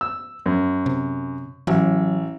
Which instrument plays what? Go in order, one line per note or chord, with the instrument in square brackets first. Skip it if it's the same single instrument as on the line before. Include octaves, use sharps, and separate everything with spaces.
[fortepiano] E6
F#2
[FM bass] C3
[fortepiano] A1 [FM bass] F#3